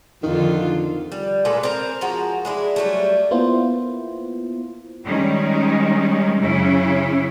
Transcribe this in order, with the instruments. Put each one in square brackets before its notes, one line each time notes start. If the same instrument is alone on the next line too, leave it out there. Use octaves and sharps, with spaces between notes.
[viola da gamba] F2 D3 F4 [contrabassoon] D#3
[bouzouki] G3
A#2 G#3 A4 B4
C4 A#4
F3 G#3 F#4 A#5
G#3 D4 E4
F#3 G3 A3
[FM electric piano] A#3 B3 E4 F4 C5
[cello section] D#3 G3 G#3 C#4
F#2 C#3 C#4 E4